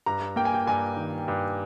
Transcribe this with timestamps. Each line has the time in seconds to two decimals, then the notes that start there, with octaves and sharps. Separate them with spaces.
0.06 G2 A#5
0.36 A#3 G5
0.45 G#5
0.54 G5
0.67 G2 G#5
0.97 D#3
1.28 G2